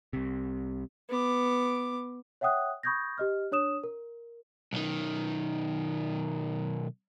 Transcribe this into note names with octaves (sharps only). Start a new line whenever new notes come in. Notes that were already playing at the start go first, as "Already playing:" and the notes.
C2 C3
B3 D6
C#5 E5 F#5 G5 D#6 F#6
B5 C#6 D#6 G6 G#6 A#6
G4 D#5 F6
D4 C#5 D#6 E7
A#4
B1 D#3